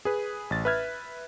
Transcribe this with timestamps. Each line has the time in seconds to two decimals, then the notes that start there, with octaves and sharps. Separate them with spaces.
0.05 G#4 B4
0.50 A1 A6
0.65 B4 E5 F6 G#6